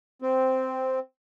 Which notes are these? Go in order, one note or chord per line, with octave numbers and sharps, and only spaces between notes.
C4